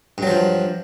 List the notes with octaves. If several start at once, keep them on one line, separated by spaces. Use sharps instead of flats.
G2 F3 F#3